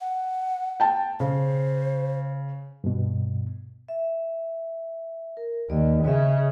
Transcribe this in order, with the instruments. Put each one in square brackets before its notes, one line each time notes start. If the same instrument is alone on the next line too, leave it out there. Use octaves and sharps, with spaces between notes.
[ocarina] F#5
[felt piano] G5 A5
[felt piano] C#3 [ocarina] C5
[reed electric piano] G2 B2
[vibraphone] E5
A#4
[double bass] D#2 [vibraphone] D5 D#5
[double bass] C#3 [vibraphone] C#5 D#5 E5